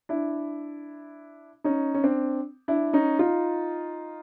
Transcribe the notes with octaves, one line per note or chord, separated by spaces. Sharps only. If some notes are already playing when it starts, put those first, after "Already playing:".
D4 E4
C#4 D#4
C#4
C4 D4
D4 E4
C#4 D#4
D#4 F4